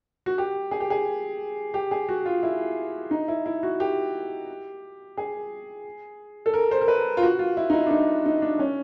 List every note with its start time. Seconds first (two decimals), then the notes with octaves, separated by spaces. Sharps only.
0.26 F#4
0.38 G4
0.71 G#4
0.80 G4
0.90 G#4
1.74 G4
1.91 G#4
2.09 F#4
2.26 F4
2.43 E4
3.11 D#4
3.28 E4
3.46 E4
3.63 F#4
3.80 G4
5.17 G#4
6.46 A4
6.54 A#4
6.71 C5
6.81 A#4
6.88 B4
7.17 F4
7.23 F#4
7.39 F4
7.57 E4
7.70 D#4
7.73 E4
7.87 D4
7.91 D#4
8.26 D#4
8.42 D4
8.59 C#4